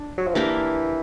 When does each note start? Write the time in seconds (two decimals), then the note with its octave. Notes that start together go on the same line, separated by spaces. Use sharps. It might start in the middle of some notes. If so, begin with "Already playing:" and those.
Already playing: D4
0.18 F#3
0.27 F3
0.35 E3 A#3 D4 G4 A#4